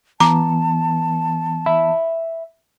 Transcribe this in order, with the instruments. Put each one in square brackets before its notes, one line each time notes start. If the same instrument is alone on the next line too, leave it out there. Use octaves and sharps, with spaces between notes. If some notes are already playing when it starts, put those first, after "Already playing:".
[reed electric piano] E3 B3 [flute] A5 [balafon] A#5 D6
[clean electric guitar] E5 B5